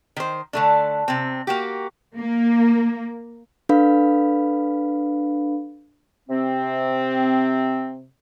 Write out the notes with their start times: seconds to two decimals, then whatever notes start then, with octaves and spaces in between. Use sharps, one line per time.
0.16 D#3 C5
0.53 D3 A3 D4
1.08 C3 C4
1.47 A#3 F#4 G4
2.18 A#3
3.69 D4 A4 B4 F5 B5
6.29 C3 C4